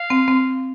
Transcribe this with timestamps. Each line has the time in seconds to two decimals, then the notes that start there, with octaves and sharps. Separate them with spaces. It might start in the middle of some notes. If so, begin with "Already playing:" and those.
Already playing: F5
0.10 C4
0.28 C4